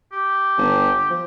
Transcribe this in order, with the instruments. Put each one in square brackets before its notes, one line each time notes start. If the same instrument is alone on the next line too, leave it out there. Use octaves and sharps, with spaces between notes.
[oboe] G4
[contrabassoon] G1
F3